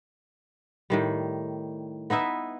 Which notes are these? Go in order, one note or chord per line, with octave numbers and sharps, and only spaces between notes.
A2 D#3 G3
B3 D#4 E4 E5